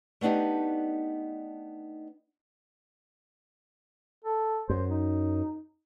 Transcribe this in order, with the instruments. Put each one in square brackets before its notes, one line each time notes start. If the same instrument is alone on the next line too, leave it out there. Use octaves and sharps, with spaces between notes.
[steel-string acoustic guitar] A3 B3 D4 D#4 G4
[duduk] A4
[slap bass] F#2 [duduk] C5
[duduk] D#4